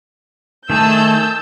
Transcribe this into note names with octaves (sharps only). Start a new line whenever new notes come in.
D#3 A3 G#4 A5 E6 G6